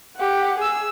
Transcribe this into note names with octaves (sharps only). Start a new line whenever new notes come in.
G4 F#5
G#4 E6